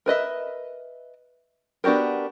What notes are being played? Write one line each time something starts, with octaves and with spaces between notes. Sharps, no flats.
A#4 B4 D#5 E5
B3 D4 F#4 G4 A#4